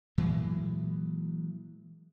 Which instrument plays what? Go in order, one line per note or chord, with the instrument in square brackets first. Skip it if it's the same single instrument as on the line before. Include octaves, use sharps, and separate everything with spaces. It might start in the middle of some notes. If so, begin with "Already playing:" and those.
[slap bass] A#2 E3 F#3 G#3